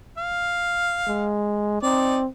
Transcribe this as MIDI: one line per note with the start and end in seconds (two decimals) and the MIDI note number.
0.18 1.30 77
1.08 1.78 56
1.83 2.26 60
1.83 2.19 63
1.83 2.19 74